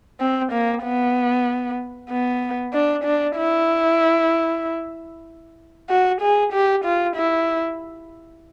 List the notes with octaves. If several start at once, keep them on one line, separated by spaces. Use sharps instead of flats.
C4
A#3
B3
B3
D4
D4
E4
F#4
G#4
G4
F4
E4